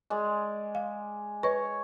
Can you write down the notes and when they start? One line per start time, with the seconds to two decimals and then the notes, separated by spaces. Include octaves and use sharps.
0.10 G#3 D5
0.75 F5
1.43 B4 C#5 D#5